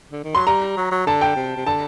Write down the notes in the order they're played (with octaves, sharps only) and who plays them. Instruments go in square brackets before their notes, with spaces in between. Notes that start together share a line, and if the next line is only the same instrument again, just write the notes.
[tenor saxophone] D3
D#3
[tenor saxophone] F#3 [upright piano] C6
[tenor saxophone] G3 [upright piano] A#5
[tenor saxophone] F#3
F#3
[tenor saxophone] D3 [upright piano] A5
[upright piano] G5
[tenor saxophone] C3
C3
[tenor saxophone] D3 [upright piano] A5